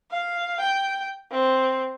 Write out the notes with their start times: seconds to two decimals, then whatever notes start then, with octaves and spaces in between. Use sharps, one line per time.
0.11 F5
0.60 G5
1.32 C4